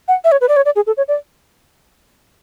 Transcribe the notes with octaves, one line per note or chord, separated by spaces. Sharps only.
F#5
E5
C#5
B4
D5
C#5
D5
G#4
A4
C#5
D5